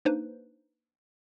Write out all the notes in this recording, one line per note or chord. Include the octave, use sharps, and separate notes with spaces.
A#3 D4 D#4 B4 C5